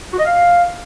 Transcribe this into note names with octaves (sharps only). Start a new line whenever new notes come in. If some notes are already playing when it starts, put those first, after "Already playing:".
F#4
D#5
F5